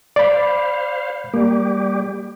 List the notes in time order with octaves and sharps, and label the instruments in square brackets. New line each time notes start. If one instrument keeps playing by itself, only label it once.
[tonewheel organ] C5 F5 [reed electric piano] D5 B5
[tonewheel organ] G3 G4 [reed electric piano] A#3